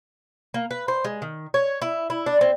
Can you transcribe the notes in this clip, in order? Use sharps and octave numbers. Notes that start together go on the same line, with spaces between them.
A#3
B4
C5
G#3
D#3
C#5
E4
E4
D4
C4